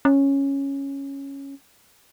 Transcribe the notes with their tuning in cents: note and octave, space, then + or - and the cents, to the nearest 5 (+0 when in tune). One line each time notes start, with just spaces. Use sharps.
C#4 -5